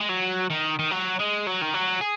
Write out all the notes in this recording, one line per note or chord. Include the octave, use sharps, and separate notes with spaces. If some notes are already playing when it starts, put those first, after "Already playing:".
G#3
F#3
D#3
D#3
F#3
G#3
F#3
D#3
F#3
G#4